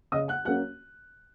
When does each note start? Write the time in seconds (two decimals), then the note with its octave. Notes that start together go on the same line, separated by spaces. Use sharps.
0.12 C#3 D#5 D#6
0.28 F#5 F#6
0.45 F#3 A#3 C#4 F#5 F#6